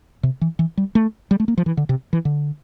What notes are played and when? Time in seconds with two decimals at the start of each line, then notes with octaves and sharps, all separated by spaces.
0.23 C3
0.41 E3
0.59 E3
0.77 G3
0.95 A3
1.31 G3
1.40 A3
1.48 A#3
1.57 F3
1.66 E3
1.77 D3
1.89 C3
2.13 E3
2.25 D3